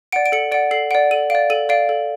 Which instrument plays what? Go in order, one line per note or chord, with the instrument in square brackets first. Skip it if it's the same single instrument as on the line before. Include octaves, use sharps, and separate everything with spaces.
[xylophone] D5 F#5 D7
D7
A4 C#7
D5 F#5 D7
A4 C7
D5 F#5 D7
A4 D#7
D5 F5 D7
A4 D#7
D5 F5 D7
A4